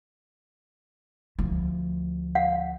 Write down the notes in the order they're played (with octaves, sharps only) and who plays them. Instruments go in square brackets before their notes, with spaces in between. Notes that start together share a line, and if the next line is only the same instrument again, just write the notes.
[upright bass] D2 F3
[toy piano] F5 F#5